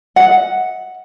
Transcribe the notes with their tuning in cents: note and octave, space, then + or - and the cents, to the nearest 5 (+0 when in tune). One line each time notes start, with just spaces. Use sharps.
D#5 +45 F#5 +0